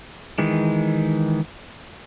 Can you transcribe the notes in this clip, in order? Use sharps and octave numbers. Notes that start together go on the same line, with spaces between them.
D#3 E3 G#3